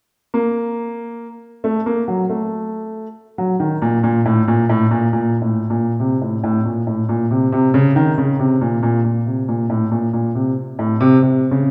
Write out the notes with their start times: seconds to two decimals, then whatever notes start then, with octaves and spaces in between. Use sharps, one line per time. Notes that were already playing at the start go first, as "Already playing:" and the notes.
0.34 A#3
1.64 A3
1.86 A#3
2.08 F#3
2.30 A3
3.38 F#3
3.60 D#3
3.82 A#2
4.04 A#2
4.25 A2
4.48 A#2
4.69 A2
4.91 A#2
5.13 A#2
5.42 A2
5.70 A#2
6.00 C3
6.21 A2
6.44 A2
6.65 A#2
6.87 A2
7.09 A#2
7.31 C3
7.52 C3
7.74 C#3
7.96 D#3
8.18 C#3
8.39 C3
8.61 A#2
8.83 A#2
9.04 A#2
9.26 C3
9.48 A#2
9.70 A2
9.91 A#2
10.13 A#2
10.35 C3
10.79 A2
11.00 C3
11.22 C3
11.51 C#3